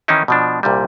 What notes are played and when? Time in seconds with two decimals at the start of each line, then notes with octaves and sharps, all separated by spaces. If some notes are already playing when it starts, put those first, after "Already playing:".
0.08 D#3 E3 C#4 D#4 E4
0.28 B2 F3 D4
0.63 C2 A#2 D3 G3